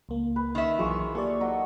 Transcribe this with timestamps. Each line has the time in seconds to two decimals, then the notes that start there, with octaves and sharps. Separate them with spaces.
0.09 C#2 A#3
0.36 B4
0.55 D#3 E5
0.79 B1 E3 F#3 F4 G#4 C#5
1.15 A#3 G4 A4 C#5 D5
1.40 F#3 D#5 E6